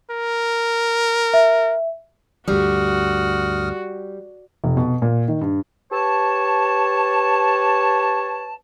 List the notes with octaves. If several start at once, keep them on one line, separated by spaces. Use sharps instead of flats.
A#4
E5
D2 G2 G3 F#4 D#6 F6
F1
B2
A#2
D#3
G2
G4 B4 C#5 A5